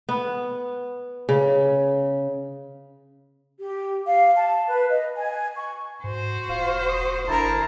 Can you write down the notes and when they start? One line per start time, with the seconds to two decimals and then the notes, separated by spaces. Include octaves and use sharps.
0.09 B3
1.29 C#3
3.60 G4
4.06 F5
4.36 A5
4.68 B4
4.90 D#5
5.16 G#5
5.56 C#6
6.04 G#2 F#4 C5
6.49 E1 F4 F5
6.89 D#6
7.28 G1 D3 E4 A#4 C5 A5